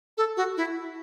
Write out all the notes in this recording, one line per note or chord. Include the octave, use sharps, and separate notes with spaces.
A4
F#4
E4